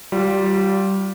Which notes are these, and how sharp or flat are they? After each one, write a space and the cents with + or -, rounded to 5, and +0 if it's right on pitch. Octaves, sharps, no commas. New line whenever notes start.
G3 -20 F4 +15